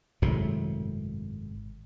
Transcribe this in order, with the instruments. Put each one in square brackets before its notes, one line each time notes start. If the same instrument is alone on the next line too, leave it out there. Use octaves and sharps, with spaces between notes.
[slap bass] G#1 F#2 A2 C3